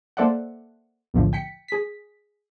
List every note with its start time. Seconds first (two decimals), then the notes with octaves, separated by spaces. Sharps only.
0.17 A#3 A4 C5 D5 E5 F#5
1.14 B1 E2 A2 D3 F3
1.33 G5 B6 C#7
1.68 G#4 B6